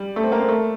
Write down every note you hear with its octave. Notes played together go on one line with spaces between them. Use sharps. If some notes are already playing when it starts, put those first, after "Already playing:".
Already playing: G3
A3
C4
A#3
C4
A3